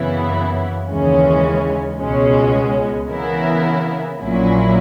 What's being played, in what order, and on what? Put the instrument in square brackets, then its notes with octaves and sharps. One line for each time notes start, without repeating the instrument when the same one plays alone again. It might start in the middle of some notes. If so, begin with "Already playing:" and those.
Already playing: [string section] F#2 C#3 E3 B3 E4
D#2 C#3 E3 G#3 C#4
C#2 B2 G#3 C#4
C#3 E3 B3 E4 A#4
A#1 A#2 F#3 C#4 E4